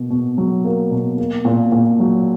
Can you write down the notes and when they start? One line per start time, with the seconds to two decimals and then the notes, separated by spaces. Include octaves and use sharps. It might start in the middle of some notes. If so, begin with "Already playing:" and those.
Already playing: B2 A#3
0.10 B2
0.38 F#3
0.65 A#3
0.91 B2
1.18 A#3
1.45 A#2
1.72 A#2
2.00 F#3